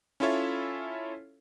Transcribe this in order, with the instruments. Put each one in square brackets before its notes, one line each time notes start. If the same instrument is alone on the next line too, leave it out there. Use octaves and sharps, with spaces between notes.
[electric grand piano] C#4 E4 F4 A4 C#5 E5